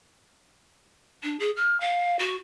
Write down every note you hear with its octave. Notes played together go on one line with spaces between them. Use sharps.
D4
G#4
F6
F5
F#4